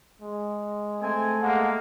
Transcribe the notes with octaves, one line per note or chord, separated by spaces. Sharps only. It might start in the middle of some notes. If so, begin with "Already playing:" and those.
G#3
A3 C4 G#5
G#3 A#3 F#5